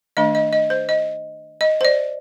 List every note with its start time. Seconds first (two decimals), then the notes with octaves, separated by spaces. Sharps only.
0.17 D#3 A3 D4 D#5
0.35 D#5
0.53 D#5
0.70 C5
0.89 D#5
1.61 D#5
1.81 C5
1.85 D5